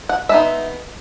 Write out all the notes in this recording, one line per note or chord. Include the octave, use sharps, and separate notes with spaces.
F#5
G#3 B3 D#4 E5